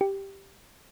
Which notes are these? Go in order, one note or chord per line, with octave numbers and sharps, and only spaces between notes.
G4